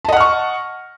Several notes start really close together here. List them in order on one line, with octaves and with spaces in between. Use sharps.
A5 D#5 F#5 F6 C#6